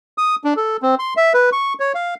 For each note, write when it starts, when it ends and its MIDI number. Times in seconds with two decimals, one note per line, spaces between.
0.18 0.35 87
0.44 0.54 62
0.57 0.77 69
0.82 0.95 60
0.99 1.14 84
1.17 1.33 76
1.34 1.50 71
1.52 1.73 85
1.80 1.92 73
1.95 2.14 77